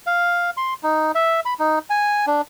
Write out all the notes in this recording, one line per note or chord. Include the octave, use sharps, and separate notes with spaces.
F5
C6
D#4
E5
B5
D#4
G#5
D4